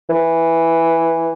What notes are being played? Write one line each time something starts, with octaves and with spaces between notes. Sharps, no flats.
E3